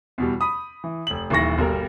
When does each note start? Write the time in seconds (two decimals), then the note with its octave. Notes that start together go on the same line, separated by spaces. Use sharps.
0.18 E2 B2 G3
0.41 B5 D#6
0.84 E3
1.07 F1 F#7
1.30 D#1 D#3 E3 C#6 A#6
1.58 G1 B2 G3 A#4